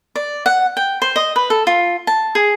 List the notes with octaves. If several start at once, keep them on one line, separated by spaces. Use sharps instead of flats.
D5
F#5
G5
C5
D#5
B4
A4
F4
A5
G#4